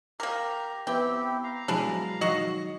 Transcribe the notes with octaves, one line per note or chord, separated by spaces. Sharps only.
A#3 G4 A#4 A#5
B3 C4 E4 G4 B4 G5
F5 A#5
B2 F#3 G#3 D4 E4 G#4
D#3 F#3 F#4 D#5